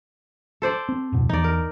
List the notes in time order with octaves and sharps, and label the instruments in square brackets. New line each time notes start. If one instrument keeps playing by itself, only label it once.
[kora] A4 C5 D5
[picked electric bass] C4
D1 F2 B2
[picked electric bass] E2 [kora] D#4 D5
[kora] A#4